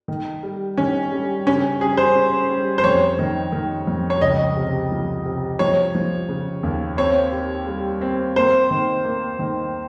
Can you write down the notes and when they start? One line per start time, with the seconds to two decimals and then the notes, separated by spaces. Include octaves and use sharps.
0.08 D#3
0.43 G3
0.77 D#3 C#4
1.12 G3
1.46 C#3 C#4
1.80 G3 G#4
1.97 C5
2.15 C#4
2.49 G3
2.78 C5
2.84 F2 C#5
3.19 D#3
3.52 D#3
3.87 F2
4.10 C#5
4.21 C#2 D#5
4.57 C3
4.92 F3
5.25 C3
5.59 F3 C#5
5.95 F3
6.29 C#3
6.63 D#2
6.97 C4 C#5
7.32 G4
7.67 G3
8.01 C4
8.36 A#3 C5
8.71 D#3
9.04 A#3
9.39 D#3